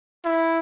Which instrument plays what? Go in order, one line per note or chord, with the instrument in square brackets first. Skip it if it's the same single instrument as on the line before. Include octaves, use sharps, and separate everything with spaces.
[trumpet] E4